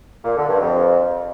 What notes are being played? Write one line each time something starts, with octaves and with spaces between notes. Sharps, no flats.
A#2
D3
G2
F2